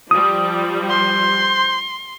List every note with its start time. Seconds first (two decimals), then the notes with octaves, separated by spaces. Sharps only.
0.11 F3 G3 D#6
0.90 C5 C6